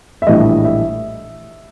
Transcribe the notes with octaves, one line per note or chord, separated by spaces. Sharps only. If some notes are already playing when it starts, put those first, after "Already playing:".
E5
A#1 A2 E3 G3 D#5
E5